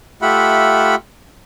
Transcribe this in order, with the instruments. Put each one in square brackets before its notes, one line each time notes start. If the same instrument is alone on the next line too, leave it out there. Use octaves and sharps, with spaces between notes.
[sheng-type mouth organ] A3 F4 G4 E5 F#5 B5